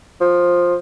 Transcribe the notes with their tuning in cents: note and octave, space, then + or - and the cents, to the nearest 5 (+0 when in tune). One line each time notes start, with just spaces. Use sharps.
F3 +10